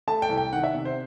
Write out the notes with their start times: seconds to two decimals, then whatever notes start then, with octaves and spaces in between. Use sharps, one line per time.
0.07 A3 A5
0.22 G5
0.29 C2
0.38 G5
0.53 D#3 F#5
0.64 E5
0.74 C3
0.85 C5